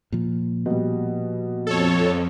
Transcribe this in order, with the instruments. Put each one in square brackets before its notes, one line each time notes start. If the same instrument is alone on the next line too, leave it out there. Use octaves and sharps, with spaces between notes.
[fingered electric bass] A#2 F3
[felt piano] B2 G3
[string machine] F2 [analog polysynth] A4 C#5